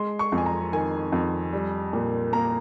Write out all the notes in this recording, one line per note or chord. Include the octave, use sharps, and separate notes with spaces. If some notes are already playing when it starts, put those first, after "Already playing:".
Already playing: G#3 C6
C#6
F2
G#5
A#5
D#3 G#5
F2
G3
A#2
A#3 A#5